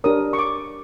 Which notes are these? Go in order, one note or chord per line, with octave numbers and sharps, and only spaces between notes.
D4 G4 A#4 C#5 D#6
C#6
D6